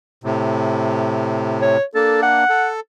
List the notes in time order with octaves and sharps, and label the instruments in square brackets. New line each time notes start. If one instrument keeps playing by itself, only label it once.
[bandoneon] A2 C3
[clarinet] C#5
[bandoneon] A#3 D4 [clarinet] A4
[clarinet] F#5
[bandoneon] A4